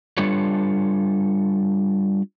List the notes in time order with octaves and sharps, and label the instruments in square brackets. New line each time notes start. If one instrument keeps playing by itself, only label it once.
[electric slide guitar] G3 D4 F4 A4 B4 C#5